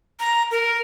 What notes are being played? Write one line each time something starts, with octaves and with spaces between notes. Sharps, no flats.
A#5
A#4